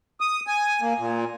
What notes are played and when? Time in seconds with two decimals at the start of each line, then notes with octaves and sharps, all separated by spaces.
0.21 D#6
0.47 G#5
0.82 A#3
0.98 A#2